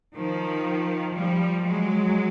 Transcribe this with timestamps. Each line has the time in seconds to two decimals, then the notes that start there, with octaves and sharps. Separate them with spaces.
0.17 D#3 F3
1.16 F3 G3
1.65 F#3 G#3